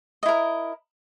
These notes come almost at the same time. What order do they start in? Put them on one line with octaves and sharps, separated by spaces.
D#5 E4 A#4